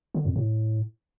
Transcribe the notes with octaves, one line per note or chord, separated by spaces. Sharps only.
D3
F2
A2